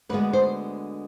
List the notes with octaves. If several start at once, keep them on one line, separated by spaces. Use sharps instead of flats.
D2 D3 G#3 B3 B4
C5